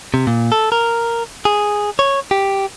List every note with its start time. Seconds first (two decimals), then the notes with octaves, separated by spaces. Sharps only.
0.14 C3
0.27 A#2
0.52 A4
0.72 A#4
1.45 G#4
1.99 C#5
2.31 G4